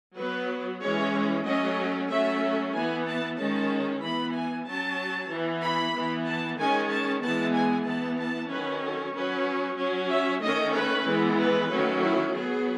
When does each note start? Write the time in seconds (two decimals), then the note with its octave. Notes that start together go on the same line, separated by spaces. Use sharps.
0.17 F#3 B3 B4
0.81 E3 G#3 C#4 C#5
1.45 F#3 A3 C#4 D#5
2.09 F#3 A3 C#4 E5
2.74 E3 B3 G#5
3.06 A5
3.37 D#3 G#3 C#4 A5
4.02 E3 B3 B5
4.34 G#5
4.66 F#3 C#4 A5
5.30 E3 B3
5.62 B5
5.94 E3 B3
6.27 A5
6.58 D#3 G#3 C#4 G#5
6.90 A5
7.22 E3 G#3 B3 A5
7.54 G#5
7.86 E3 B3 A5
8.18 A5
8.50 D#3 F#3 C#4 B4
8.82 A4
9.14 F#3 C#4 B4
9.79 F#3 C#4
10.10 E5
10.42 D#3 A3 C#4 D#5
10.74 B4
11.06 E3 G#3 B3
11.39 B4
11.70 D#3 F#3 A3 C#4
12.02 E4
12.34 F#3 B3 G#4